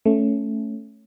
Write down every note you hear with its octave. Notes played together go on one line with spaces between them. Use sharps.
A3 C#4